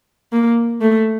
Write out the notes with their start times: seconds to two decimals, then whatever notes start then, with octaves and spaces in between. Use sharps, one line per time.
0.32 A#3
0.81 A3